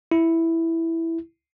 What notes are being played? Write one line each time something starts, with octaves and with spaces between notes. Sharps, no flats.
E4